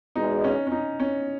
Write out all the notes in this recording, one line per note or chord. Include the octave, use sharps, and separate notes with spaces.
E2 B2 G#3 D#4
C#4
C#4
D#4
C#4